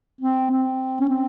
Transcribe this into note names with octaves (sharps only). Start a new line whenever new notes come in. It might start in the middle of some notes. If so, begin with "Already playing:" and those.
C4
C4
C#4
C4